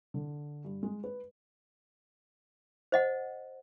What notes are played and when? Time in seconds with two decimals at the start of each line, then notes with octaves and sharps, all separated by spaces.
0.14 D3
0.65 G2
0.83 G#3
1.04 B4
2.92 C5 D#5 F#5